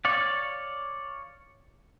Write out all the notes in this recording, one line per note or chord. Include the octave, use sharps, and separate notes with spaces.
C#5 D5 F5